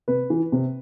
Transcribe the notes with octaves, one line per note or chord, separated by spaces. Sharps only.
C3 B4
E3
C3